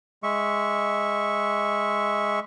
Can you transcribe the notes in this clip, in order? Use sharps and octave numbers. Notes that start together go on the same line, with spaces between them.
G#3 E5 C#6